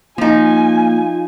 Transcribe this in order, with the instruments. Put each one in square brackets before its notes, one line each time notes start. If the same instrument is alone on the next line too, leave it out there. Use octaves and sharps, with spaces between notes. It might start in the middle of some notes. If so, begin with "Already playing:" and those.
[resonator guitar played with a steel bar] F3 D#4 [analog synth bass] A#3 [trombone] F4 [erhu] G#5